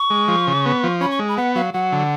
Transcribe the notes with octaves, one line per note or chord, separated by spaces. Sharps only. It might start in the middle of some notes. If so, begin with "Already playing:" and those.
Already playing: C#6
G#3
F3
C#3
B3
F3
C#4 B5
C#6
G#3
B5
B3 F#5
F#3 F5
F#3 F#5
D3